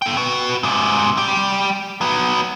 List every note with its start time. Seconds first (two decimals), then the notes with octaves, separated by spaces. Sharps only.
0.02 A4 G5
0.17 F#4 B4
0.63 G#2 C3
1.18 G3 G4
2.01 F#3 B3